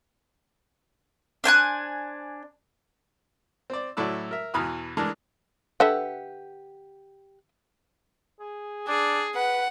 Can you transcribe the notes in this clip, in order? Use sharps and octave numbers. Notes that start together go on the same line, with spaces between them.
D4 C5 G#5 F#6
C4 D5
A2 F#3 E4 A4 D5 E6
A#4 E5
E2 B2 E3 B5 D#6 F6
E3 G#3 A3 D4 A#4
D3 G4 A4 B4 E5 F#5
G#4
D4 G#4
B4 F#5